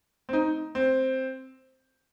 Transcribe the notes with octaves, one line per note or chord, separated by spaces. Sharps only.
C4
D#4
C4